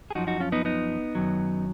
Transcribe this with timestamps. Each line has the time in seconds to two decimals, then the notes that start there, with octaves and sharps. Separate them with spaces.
0.10 G#4
0.15 F#2 F3 D#4 F#4
0.27 D#4 F#4
0.40 C#4 F4
0.52 B3 D#4
0.65 B3 D#4
1.15 F#2 D#3 F#3